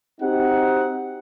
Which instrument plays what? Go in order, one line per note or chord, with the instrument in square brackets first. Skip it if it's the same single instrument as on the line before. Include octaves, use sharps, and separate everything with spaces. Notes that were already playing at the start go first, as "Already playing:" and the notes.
[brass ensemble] C4 D#4 F#4 G4 F#5